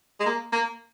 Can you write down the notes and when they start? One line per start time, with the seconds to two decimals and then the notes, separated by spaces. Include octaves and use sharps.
0.20 G#3
0.26 A#3
0.52 A#3